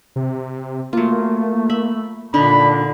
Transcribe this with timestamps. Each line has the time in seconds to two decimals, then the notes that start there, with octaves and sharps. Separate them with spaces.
0.16 C3
0.93 F#3 A3 A#3 F4
1.70 E5 B5
2.34 A#2 D3 D4 D#4 B5